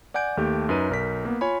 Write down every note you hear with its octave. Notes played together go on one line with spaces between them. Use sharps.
D5 F#5 G#5 G6 D7
D#2 A3 G4
F#2 D#4 B4 D#7
B1 A#4 B6
A#3 B3
F4 C#5 G#5 B5